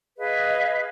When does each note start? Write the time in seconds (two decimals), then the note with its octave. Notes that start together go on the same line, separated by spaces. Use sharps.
0.19 G#4 B4 D#5 F5